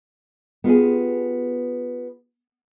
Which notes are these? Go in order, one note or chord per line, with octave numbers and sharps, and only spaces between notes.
B3 F4 G4 G#4